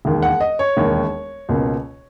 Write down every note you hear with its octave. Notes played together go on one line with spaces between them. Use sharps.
E1 D#2 D#3
F#5
D#5
C#5
E1 D#2 D#3
C#2 B2 A#3 C#4